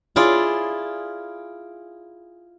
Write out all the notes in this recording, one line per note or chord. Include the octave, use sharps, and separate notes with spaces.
E4 F4 G#4 D5